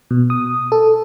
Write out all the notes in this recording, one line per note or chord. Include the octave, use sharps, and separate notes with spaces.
B2
D#6
A4